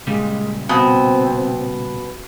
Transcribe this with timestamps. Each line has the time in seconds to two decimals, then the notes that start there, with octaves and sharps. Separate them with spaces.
0.07 A#2 C#3 G3 G#3
0.69 B2 C4